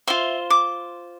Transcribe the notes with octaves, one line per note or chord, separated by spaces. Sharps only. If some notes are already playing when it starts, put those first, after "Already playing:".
F4 C5 E5
D6